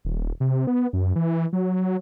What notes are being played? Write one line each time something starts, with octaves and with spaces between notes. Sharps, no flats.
D#1
C3
B3
F#2
E3
F#3